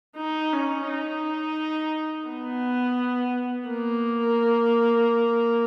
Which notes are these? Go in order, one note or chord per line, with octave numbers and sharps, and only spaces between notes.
D#4
C#4
D#4
B3
A#3